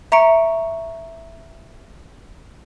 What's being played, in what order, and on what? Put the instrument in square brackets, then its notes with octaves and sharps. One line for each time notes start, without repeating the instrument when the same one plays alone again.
[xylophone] E5 A#5 C#6 C#7 D7